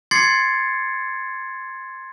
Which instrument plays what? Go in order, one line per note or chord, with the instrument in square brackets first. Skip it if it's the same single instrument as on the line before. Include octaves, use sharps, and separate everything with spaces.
[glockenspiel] C6 D6 G#6 A6 C7 C#7